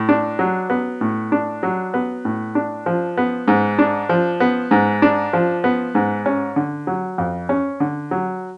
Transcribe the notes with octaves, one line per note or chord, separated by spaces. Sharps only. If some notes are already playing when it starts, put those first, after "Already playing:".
Already playing: A2
D4
F#3
B3
A2
D4
F#3
B3
A2
D4
F3
B3
G#2
D4
F3
B3
G#2
D4
F3
B3
G#2
C#4
D3
F#3
F2
C#4
D3
F#3